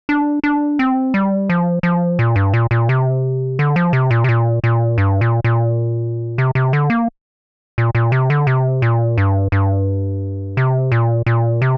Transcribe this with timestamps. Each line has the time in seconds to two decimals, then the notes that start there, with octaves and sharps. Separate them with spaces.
0.09 D4
0.44 D4
0.79 C4
1.14 G3
1.50 F3
1.83 F3
2.19 A#2
2.36 G2
2.54 A#2
2.71 A#2
2.89 C3
3.59 D3
3.76 F3
3.93 C3
4.11 A#2
4.24 C3
4.29 A#2
4.64 A#2
4.98 G2
5.21 A#2
5.44 A#2
6.38 C3
6.55 C3
6.73 D3
6.90 A#3
7.78 A#2
7.95 A#2
8.12 C3
8.30 D3
8.47 C3
8.82 A#2
9.18 G2
9.52 G2
10.57 C3
10.92 A#2
11.26 A#2
11.62 C3